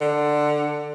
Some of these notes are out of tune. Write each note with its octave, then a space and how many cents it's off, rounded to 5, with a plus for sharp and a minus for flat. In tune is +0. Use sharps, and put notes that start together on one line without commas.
D3 +15